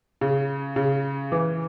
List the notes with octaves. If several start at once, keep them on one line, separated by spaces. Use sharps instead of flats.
C#3
C#3
E3